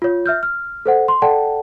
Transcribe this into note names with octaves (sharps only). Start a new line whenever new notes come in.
F4 C#5
E5 F6 G6
F6
A4 C5 F#5
C6
A4 D5 F#5 G5 A5